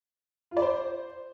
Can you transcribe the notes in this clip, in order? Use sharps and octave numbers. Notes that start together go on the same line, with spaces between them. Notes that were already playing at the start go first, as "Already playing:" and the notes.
F4
D5
C5